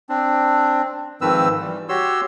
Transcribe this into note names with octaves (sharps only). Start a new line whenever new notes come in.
C4 D4
G#2 D#3 F3 C4 B4 E6
E3 G3
F#4 G4 C#5 C6 E6